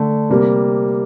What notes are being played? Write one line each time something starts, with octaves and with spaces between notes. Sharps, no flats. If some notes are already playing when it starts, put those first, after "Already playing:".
Already playing: D3 A3
C3 G3 A#3